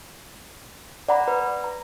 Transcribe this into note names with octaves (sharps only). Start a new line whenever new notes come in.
D5 F#5 A#5 B5
B4
A#5